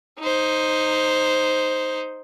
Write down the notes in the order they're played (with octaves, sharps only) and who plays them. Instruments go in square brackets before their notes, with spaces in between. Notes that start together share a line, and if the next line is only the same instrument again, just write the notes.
[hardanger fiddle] D#4 C5